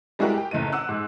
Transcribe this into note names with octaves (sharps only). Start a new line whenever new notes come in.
G3 G#3 E4 F#4 G4 A#4
G4 G5
F#1 D#2 A2 D#5 D#7
F#5 D6 E6 F#6
G#2